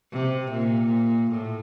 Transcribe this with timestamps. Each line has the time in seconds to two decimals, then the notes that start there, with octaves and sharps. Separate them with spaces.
0.12 C3
0.52 A#2
1.31 A2